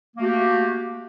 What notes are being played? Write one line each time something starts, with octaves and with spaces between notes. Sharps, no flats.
A3 A#3 F#4 G4